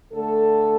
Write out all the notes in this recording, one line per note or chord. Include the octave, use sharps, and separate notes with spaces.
D3 A3 A4